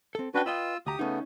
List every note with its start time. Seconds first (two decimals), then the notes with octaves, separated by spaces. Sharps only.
0.15 C4 A4
0.34 C#4 D4 F#4 B4 G5
0.46 F4 B4 D#5 G5 E6
0.87 D2 G4 A#5 D#6
0.99 C#3 A3 B3 C#4 D#4